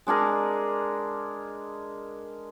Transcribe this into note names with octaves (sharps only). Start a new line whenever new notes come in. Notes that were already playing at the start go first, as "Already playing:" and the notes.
G#3 D4 G#4 A#4